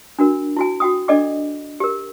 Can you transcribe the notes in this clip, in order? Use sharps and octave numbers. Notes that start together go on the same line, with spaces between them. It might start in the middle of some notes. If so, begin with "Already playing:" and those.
D4 F#4 A#4
E4 F#4 G#5
F#4 G5 D#6
D4 A4 D5 D#5 G5 D6
G4 A#4